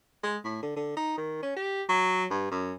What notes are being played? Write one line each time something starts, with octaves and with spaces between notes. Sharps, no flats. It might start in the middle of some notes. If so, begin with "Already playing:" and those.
G#3
A2
D3
D3
D#4
D#3
C#4
G4
F#3
G2
F#2